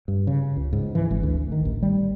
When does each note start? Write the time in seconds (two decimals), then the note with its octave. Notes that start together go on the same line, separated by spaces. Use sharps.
0.08 G2
0.27 C#3
0.57 C#2
0.73 G#2
0.95 E3
1.11 G#1
1.23 D2
1.52 D#3
1.65 A1
1.82 G3